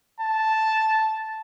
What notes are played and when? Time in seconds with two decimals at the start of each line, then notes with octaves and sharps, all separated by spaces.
0.20 A5